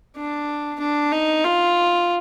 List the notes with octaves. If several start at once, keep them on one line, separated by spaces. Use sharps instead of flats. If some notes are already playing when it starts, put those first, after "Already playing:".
D4
D4
D#4
F4